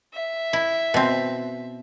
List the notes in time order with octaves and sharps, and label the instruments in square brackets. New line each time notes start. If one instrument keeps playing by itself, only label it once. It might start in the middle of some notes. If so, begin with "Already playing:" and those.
[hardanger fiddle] E5
[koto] E4
B2 C4